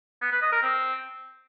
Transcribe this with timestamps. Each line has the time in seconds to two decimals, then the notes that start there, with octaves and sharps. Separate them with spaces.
0.22 B3
0.32 B4
0.42 D#5
0.52 A#4
0.62 C4